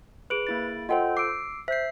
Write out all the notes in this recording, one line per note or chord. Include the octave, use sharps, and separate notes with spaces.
G#4 B4 D7 F#7
A#3 E4 A6
F4 A4 C5 D#5 F#5 G5
D6 E6 C7 D7
C5 E5 G6 C7